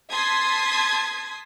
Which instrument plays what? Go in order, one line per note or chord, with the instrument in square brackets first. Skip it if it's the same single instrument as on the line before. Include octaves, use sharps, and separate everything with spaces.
[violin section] A5 C6 D#6 G#6 B6